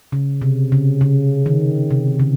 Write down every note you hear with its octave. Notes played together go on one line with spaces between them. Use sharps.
C#3
C3
C#3
C#3
D#3
C3
C#3